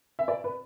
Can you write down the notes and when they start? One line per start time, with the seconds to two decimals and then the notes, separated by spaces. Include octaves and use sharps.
0.19 E5
0.28 D5
0.44 B4